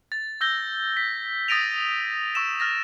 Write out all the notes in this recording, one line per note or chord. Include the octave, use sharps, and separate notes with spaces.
A6
E6 G6 A#6 G7
B6
D#6 A6 A#6 D7 D#7 F7
C#6 E6 E7
F6 A6 A#6